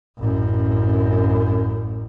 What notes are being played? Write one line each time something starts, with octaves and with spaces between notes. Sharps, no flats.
A1 F#2